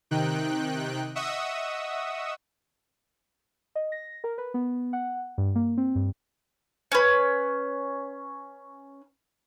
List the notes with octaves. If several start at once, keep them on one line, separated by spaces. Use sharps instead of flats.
C3 D#3 D#4 G5 F#6
D#5 E5 F#5 C#6 D#6 E6
D#5
A#6
A#4
B4
B3
F#5
G2
A#3
C4
G2
C#4 B4